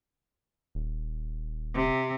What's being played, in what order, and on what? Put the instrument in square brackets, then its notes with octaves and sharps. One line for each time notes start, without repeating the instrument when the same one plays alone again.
[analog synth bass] D#1
[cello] C3